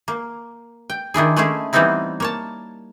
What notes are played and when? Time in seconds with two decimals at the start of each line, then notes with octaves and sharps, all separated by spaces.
0.08 A#3
0.90 G5
1.14 D#3 D4 E4 G#4
1.37 G#3 A3 C#4 E4 G#4
1.73 E3 G3 B3 C4 D#4 E4
2.20 A#3 C#5 A5